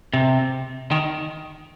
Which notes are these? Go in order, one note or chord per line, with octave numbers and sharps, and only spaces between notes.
C3
D#3